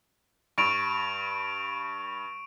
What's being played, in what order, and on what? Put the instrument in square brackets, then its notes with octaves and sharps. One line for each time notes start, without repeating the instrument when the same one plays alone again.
[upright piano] G2 [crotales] C#6 D7 F7